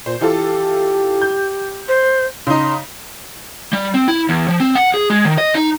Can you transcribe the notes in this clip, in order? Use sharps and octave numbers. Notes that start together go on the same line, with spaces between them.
A#2 C5
E3 F4 G4 A4
G6
C5
C#3 D#4 C6
G3
C4
E4
E2
F3
C4
F#5
G#4
G#3
D#3
D#5
D#4